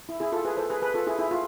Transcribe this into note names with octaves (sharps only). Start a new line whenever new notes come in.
E4
E4 G#4
F4 A4
G#4 B4
A4 C5
G#4 B4
G#4 B4
F4 A4
E4 G#4
E4 G#4
F4